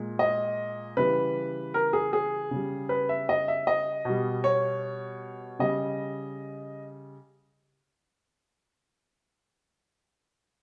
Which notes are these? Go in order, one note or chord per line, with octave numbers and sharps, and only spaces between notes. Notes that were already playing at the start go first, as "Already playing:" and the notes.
Already playing: A#2 G#3
D#5
C#3 E3 G3 B4
A#4
G#4
G#4
C#3
G3
B4
E5
D#5
E5
D#5
B2 G3
C#5
C#3 G3 D#5